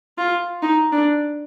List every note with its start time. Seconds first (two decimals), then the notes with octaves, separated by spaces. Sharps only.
0.18 F4
0.62 D#4
0.92 D4